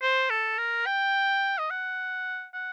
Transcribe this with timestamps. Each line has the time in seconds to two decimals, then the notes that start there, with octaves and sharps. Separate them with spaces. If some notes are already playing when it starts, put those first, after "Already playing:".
0.02 C5
0.30 A4
0.58 A#4
0.86 G5
1.58 D#5
1.70 F#5
2.53 F#5